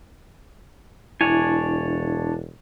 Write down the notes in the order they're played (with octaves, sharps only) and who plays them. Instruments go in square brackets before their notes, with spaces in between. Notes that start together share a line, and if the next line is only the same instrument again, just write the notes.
[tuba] E1 [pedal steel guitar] D4 C#5 G#5 [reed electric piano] E4